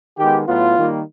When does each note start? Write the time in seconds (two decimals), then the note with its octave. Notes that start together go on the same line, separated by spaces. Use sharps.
0.18 D#3 G#3 B3 G4
0.47 A2 F#3 B3 F4
0.77 D#3 G3 A#3